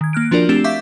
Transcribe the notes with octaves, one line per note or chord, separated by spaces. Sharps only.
D#3 G#6
A#3 F6 F#6 D7
F3 D4 F4 F#4 A#4 D5
A3 C4 D4 G4 E6 E7
E5 F5 C#6 D6 G6 B6